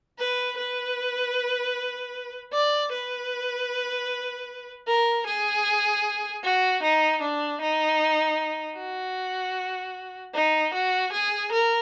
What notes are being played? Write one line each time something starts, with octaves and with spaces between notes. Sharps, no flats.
B4
B4
D5
B4
A#4
G#4
F#4
D#4
D4
D#4
F#4
D#4
F#4
G#4
A#4